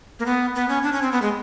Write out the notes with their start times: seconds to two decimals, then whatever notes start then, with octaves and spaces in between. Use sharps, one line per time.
0.19 A#3
0.26 B3
0.55 B3
0.69 C#4
0.83 D4
0.93 C#4
1.02 C4
1.12 B3
1.22 G#3